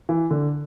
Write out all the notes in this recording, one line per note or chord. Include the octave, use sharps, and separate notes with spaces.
E3
D3